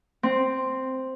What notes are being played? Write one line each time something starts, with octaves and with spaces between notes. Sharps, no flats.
C4